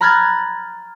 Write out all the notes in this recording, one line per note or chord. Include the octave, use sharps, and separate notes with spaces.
A#5 B5 F6 F#6 G#6 A6